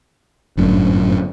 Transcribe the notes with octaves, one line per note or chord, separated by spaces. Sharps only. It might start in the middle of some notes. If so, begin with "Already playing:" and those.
G1 F#2 A2 D3